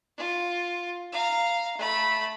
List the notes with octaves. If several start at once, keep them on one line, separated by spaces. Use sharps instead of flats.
F4
F5 A#5
A3 B5